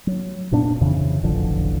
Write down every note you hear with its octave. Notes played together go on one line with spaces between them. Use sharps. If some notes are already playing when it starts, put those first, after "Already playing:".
F#3
F1 A#2 B3 D4
F2 C#3 E3
E1 A1 D3 F3